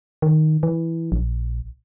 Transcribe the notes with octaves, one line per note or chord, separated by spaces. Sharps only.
D#3
E3
A#1